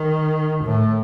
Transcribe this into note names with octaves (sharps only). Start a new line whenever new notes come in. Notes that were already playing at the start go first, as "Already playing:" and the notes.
Already playing: D#3
A2